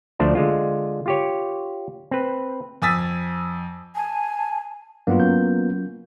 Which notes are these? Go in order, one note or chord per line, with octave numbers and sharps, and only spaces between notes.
D2 F3 A3 D4 C5 D5
D3 G#3 F4
F4 G4 C#5
C4 B4
F2 G#5 D#6 E6 A6 B6
G#5 A5
G2 F#3 A#3 B3 D4 F4
F#3 C#4 G6